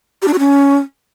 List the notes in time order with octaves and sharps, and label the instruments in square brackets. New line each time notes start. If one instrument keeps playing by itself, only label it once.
[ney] G4
D4
F#4
C#4